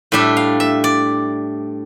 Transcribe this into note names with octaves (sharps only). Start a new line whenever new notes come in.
A2 G3 D4 E5
F5
E5
D5